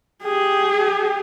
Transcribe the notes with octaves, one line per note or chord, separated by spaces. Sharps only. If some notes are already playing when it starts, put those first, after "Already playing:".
G4 G#4